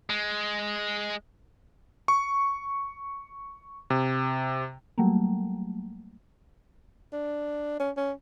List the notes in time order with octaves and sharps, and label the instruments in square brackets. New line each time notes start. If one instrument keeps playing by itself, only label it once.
[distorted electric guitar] G#3
[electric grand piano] C#6
C3
[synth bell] F#3 G3 A3 A#3
[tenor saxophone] D4
C#4
C#4